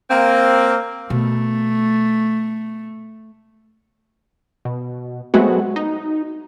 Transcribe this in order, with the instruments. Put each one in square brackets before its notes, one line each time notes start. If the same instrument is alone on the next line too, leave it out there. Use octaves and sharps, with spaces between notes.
[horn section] A#3 C4
[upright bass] B2 [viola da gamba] A3
[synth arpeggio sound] B2
F#3 G#3 A3 B3 C4 F#4
D#4